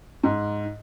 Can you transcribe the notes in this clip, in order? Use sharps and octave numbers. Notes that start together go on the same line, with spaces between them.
G#2